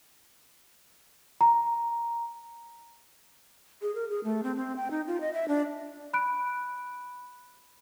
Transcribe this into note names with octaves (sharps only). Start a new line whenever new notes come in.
A#5
G#4
A#4
G#4
A3
C4
C4
G5
D#4
F4
D#5
E5
D4
B5 F#6 D7